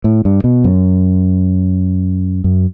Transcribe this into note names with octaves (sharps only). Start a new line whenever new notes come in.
A2
G2
B2
F#2
F#2